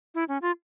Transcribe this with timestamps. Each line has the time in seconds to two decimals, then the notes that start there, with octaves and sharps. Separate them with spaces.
0.15 E4
0.29 C#4
0.42 F4